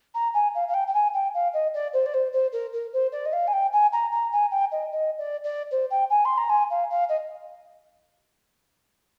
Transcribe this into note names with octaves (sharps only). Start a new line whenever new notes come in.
A#5
G#5
F5
F5
G5
G5
G#5
G5
F5
D#5
D5
C5
D5
C5
C5
A#4
A#4
C5
D5
D#5
F5
G#5
G5
G#5
A#5
A#5
G#5
G5
D#5
D#5
D5
D5
C5
G5
G#5
C6
A#5
G#5
F5
F5
D#5